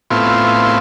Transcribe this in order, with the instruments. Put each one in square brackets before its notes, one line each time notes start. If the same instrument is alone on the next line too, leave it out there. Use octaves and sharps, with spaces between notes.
[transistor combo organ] A2 B3 C4 E4 F4